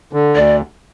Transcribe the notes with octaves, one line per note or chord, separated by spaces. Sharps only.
D3
D2 D5